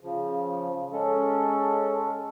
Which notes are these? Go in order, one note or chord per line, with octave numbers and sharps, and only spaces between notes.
C#3 F3
G#3 C#4 A4